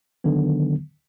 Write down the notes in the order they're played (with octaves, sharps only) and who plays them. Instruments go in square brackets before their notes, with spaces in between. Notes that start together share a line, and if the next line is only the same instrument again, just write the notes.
[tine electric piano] D3 D#3 F#3 B3